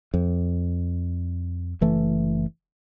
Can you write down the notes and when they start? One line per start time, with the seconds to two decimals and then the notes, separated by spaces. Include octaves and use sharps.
0.14 F2
1.81 F#1 E3 A3